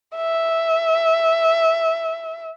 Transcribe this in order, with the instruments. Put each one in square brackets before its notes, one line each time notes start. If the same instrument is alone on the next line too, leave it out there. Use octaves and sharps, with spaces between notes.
[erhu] E5